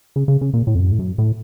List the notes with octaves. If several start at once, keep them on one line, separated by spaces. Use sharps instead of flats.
C#3
C#3
C#3
A#2
A2
F2
F#2
A2
F#2
A2